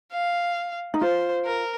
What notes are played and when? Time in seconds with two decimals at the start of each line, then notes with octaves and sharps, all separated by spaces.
0.12 F5
0.94 D#4
1.01 F4 C5
1.45 A#4